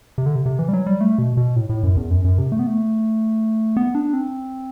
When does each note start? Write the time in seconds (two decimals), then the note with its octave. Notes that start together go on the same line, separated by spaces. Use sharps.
0.18 C3
0.26 D3
0.35 C3
0.46 C3
0.59 E3
0.68 G3
0.73 F#3
0.86 G3
1.01 A3
1.18 B2
1.37 B2
1.56 A2
1.69 A2
1.83 F#2
1.97 E2
2.11 F#2
2.24 F#2
2.38 C3
2.52 A3
2.59 B3
2.67 A3
3.77 B3
3.95 D4
4.13 C4